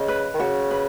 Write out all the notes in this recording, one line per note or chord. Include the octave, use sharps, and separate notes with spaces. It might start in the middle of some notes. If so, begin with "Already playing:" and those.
Already playing: C#3 D#5
B4
D#3
C#3 F#4
B4